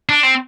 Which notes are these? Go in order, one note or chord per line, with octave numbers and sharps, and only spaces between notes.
D4
C4